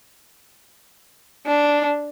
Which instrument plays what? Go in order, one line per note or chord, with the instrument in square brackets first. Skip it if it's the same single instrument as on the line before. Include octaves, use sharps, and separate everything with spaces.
[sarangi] D4